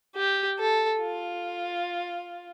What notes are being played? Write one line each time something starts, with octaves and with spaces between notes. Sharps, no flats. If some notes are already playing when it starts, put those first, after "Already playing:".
G4
A4
F4